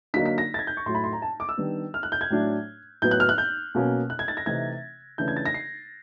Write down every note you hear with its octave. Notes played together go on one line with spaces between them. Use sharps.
D3 F#3 A#3 D#4 B6
B6
A#6
A6
G#6
G6
C#6
A2 F#3 A3 C6
B5
C6
A#5
A5
D6
E6
D#3 G3 B3 D4
F6
F#6
G6
G#6
A2 F#3 A3 D4
A2 F#3 B3 G6
F#6
F6
F#6
G6
B2 F#3 A#3 C#4
F#6
G#6
A6
A#6
C3 E3 A3 C4 D#4 G#6
C#3 E3 A3 D4 G6
G#6
A6
A#6
C7